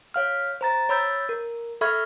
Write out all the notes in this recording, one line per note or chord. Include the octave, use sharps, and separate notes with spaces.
C#5 F5 F6
C5 A#5 A6
C#5 B5 E6 G6 A6
A#4
A4 E5 B5 C#6 F6 G#6